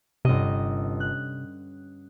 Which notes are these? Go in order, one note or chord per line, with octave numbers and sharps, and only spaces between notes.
G1 C3 C#4 D#5
F#6